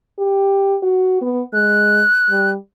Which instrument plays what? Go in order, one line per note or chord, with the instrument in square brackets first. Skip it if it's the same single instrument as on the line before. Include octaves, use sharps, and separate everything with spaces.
[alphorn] G4
F#4
B3
[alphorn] G#3 [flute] F#6
[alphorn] G3